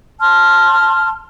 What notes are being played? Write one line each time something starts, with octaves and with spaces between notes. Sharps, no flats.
A5 C6 F6